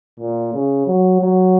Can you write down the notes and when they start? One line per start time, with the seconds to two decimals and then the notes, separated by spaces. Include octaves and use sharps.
0.20 A#2
0.53 C#3
0.87 F#3
1.21 F#3